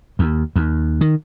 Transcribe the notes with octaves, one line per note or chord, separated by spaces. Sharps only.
D#2
D#2
D#3